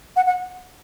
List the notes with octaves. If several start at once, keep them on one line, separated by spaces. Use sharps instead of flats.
F#5
F#5